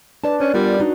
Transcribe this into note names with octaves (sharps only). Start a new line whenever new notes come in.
D4 B4 D5 A5
C#4 C5
G3 B3 F4 A#4
D4 D#4 F#4